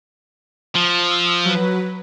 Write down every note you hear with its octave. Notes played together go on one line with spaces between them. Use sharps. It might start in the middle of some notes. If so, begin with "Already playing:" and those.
F3
E6
F#3 B4